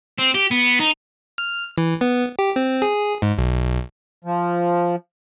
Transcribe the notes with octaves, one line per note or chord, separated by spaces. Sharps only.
C4
G4
B3
D#4
F6
E3
B3
G4
C4
G#4
G#2
B1
F3